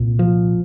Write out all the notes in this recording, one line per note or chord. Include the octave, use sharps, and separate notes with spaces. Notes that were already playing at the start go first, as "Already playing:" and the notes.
Already playing: C2 A#2
F3